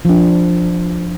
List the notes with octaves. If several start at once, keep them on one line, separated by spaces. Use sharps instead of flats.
F3 D4